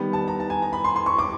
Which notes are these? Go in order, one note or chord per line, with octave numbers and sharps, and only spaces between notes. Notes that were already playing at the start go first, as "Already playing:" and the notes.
Already playing: D#3 G3 B3
A5
A#5
A5
G#5
A#5
B5
C6
C6
C#6
D6